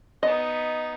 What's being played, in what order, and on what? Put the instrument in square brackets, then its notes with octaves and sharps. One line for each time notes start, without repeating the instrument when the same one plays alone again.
[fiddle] B3 D#4 [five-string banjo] D#5